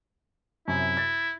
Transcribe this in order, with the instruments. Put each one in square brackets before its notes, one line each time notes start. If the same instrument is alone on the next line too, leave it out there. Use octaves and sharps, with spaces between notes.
[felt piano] F#2 C3 [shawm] E4
[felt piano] A6